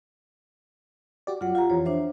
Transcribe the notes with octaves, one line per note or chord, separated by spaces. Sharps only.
F#4 G4 D5
F#2 F#3 F4 F#5
F4 G4 F5 A#5
F2 E3 F3 C#5
D4 C5 E5